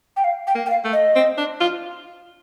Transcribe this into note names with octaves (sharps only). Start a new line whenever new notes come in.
G5
F5
G5
A#3
G5
F5
A3
D#5
C4
D4
F4